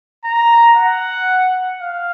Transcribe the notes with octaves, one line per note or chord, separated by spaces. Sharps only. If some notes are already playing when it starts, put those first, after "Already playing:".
A#5
F#5
F5